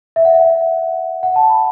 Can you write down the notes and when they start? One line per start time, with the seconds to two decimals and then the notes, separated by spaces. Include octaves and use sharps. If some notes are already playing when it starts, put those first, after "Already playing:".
0.16 E5
0.25 F#5
0.34 E5
1.23 F#5
1.36 A5
1.49 B5